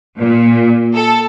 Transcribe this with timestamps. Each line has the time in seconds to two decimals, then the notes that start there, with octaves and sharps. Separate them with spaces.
0.18 A#2
0.94 A4